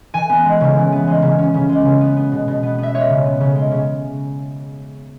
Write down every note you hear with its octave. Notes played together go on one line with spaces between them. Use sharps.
E3 G#5
B3
G#3
C#3
E3
B3
G#3
C#3
C#4
C#3
G#3
C#3
B3
B3
B2
B2
B3
B3 E5
G#3 C#5
C#3
B3
C#3
G#3
C#3